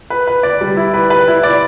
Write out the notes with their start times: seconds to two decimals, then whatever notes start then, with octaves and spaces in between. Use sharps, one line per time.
0.10 B4
0.27 B4
0.43 D5
0.61 G3
0.77 E4
0.94 B4
1.10 B4
1.27 E4
1.43 D5